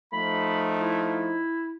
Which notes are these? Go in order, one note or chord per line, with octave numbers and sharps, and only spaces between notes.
F3 A3 D#4 B5
E4